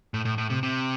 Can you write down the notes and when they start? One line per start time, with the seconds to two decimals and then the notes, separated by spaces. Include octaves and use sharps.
0.14 A2
0.25 A2
0.38 A2
0.50 C3
0.63 C3